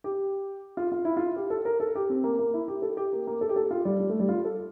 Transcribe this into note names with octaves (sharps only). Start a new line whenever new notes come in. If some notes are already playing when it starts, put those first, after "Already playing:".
G4
F4
F4
E4
F4
G4
A4
A#4
A4
G4
C4
A#3
A#3
E4
G4
A4
G4
A#3
A#3
A4
G4
A4
F4
G3
G3
A3
G3
F4
A4